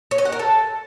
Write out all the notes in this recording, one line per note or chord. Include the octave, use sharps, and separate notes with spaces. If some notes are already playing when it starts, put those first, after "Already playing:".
C#5
D#5
F#5
A#4
A4